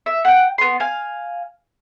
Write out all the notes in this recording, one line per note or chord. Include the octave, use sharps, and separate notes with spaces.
E5
F#5 G5
B3 C6
F5 G#5